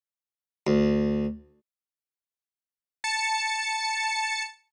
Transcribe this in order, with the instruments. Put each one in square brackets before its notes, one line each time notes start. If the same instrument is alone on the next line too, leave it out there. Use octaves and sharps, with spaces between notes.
[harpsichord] D2
[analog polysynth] A5 C#7